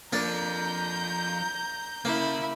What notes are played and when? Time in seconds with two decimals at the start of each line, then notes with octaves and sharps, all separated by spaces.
0.13 F3 A#3 D4 A4 A#5 G6
2.05 C#3 A#3 E4